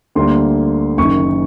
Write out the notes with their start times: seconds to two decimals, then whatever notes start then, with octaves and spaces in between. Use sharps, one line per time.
0.15 D2 D3 G3 A#3 C6
0.98 F#1 F#2 D#3 C#6